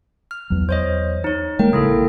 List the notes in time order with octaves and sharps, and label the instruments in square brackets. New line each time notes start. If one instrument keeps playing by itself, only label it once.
[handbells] F6
[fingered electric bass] E2 F#3
[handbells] C5 C#5 D#5
D#4 C#5
[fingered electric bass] G#3 A#3 [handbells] A#4 G5
[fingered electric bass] A1 C#3 [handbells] A#3 E4 A4